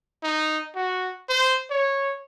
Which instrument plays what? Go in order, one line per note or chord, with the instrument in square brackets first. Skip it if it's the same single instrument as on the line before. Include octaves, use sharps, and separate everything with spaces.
[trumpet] D#4
F#4
C5
C#5